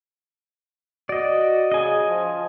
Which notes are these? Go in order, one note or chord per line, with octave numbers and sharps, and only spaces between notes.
F#4 D5 D#5
C#3 D#5 G#5
F3